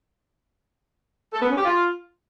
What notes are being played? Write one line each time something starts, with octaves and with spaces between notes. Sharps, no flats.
A4
B3
C#4
G4
F4